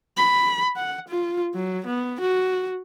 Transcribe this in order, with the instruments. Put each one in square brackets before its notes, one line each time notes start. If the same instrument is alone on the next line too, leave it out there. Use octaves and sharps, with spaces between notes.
[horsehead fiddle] B5
F#5
F4
F#3
B3
F#4